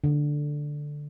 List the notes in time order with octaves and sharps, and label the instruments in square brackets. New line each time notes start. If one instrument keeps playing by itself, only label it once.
[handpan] D3